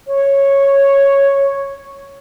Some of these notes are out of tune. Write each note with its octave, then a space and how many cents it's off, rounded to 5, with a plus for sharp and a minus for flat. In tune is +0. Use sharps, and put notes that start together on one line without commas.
C#5 -5